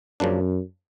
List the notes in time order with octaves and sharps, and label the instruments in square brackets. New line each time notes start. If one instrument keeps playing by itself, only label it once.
[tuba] F#2 [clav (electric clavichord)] C#3 F3 A#3 D4